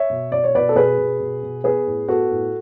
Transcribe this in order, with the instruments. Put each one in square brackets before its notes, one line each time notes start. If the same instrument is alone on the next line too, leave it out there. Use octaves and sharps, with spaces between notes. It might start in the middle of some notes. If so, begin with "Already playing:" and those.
Already playing: [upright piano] C#5 E5
B2
B2 D5
C#5
B2 B4 D5
A4
B2 G#4 B4
B2
B2
B2
B3 G#4 B4
A2
B3 F#4 A4
A2